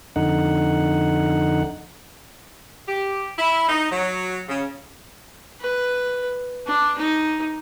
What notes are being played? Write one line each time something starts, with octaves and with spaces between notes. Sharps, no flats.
F2 D3 D#4 F#5
G4
E4
D#4
F#3
C#3
B4
D4
D#4